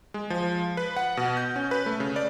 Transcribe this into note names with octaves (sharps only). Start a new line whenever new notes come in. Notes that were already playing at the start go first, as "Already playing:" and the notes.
G#3
F3
B4
F#5
B2
G6
C#4
B4
A3
C#3
D5